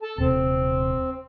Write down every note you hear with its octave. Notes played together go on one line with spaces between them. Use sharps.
A4 A5
D#1 C3 C4